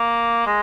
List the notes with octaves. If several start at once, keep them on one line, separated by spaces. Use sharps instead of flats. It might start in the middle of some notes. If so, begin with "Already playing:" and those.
Already playing: A#3
G#3